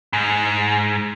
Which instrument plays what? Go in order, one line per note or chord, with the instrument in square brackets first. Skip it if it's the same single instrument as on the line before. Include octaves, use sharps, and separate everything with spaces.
[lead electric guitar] G#2